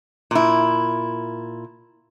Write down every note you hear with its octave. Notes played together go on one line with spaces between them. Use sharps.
A#2 E4